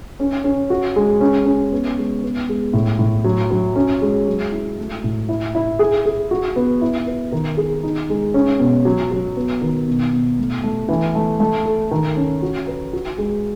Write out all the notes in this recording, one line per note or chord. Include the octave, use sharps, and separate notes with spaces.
C#4
C#4
F#4
G#3
C#4
C#4
B3
G#3
B3
G#3
A2
A2
F#3
F#3
C#4
G#3
F#3
E4
A3
A2
E4
E4
G#4
G#4
F#4
B3
E4
B4
D#3
G#4
D#4
G#3
C#4
B2
F#3
F#3
B3
D#3
B2
B2
A3
A3
E3
A3
A3
A4
D#3
C#4
F#4
B4
F#4
G#3